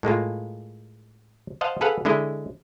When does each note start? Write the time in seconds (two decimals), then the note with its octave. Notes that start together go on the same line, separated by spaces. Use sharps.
0.03 A2 G#3 A#3 F4
1.61 C5 D#5 F5 F#5 A5
1.81 G#4 A4 B4 F5 F#5
2.05 D3 G#3 E4 D#5